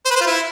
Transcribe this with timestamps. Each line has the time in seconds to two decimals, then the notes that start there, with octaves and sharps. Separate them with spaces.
0.05 C5
0.11 B4
0.16 C5
0.21 F4
0.26 E4